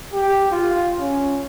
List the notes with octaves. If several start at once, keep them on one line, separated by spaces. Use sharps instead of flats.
G4
F4
C#4